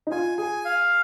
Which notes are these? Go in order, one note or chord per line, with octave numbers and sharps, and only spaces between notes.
D#4
F4 G#5
G#4 G#5
F5